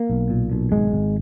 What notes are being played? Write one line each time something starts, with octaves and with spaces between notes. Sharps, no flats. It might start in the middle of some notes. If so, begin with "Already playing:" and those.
Already playing: A#3
B1
A#2
B1
G#1 G#3
G#1